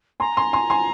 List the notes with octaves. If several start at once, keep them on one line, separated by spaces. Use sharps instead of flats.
G#5 A#5 C6
G#5 C6
G#5 C6
G#5 C6